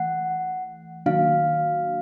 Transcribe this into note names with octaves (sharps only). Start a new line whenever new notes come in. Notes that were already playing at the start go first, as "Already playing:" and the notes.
Already playing: E3 A3 F#5
D#3 F#3 A#3 D4 F#4 F5